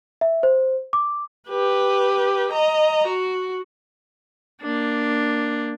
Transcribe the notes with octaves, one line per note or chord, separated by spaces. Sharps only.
E5
C5
D6
G4 B4
D#5 A#5
F#4
A#3 D4